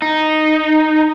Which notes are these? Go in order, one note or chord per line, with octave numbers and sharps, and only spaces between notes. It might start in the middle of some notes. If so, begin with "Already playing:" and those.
D#4